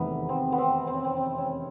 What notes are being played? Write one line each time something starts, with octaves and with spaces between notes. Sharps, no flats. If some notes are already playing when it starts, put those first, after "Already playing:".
Already playing: F1 E2 C3 D#3 B3
C4
B3
C4
C4
C#4
C4
C4
C#4